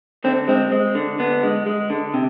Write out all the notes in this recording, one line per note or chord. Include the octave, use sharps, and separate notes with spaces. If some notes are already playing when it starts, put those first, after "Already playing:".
D3 C4
G#3 C4
G#3
D3
D3 B3
G#3
G#3
D3
C3